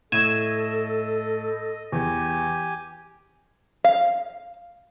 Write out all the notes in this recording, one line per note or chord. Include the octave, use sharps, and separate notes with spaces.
A2 A4 D#5 G#6 D#7 E7
E2 G4 G#5
F5